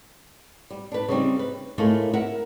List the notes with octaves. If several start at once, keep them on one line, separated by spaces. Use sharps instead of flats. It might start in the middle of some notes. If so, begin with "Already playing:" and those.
G3
D4 B4
C#3 G3 C4 D#4
B4
A2 A3 A#3 D#4 F4 G#4
A#4 E5 F#5